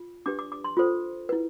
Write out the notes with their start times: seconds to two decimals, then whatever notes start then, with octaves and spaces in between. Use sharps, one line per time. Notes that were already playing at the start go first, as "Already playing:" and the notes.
Already playing: F4
0.26 D4 G4 B4 D6
0.39 D6
0.52 D6
0.64 C6
0.77 F4 A4 C5
1.29 E4 B4